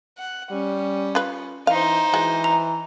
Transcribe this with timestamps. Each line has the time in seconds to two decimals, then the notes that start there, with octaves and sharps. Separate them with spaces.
0.18 F#5
0.51 G3 C#4
1.15 F4 B4
1.67 E3 D#4 C5 F5
2.14 E3 G#3 F#4
2.44 A#5